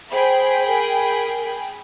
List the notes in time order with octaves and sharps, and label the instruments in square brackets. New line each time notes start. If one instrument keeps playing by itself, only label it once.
[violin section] G#4 G5 B5 [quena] C5
[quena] A#4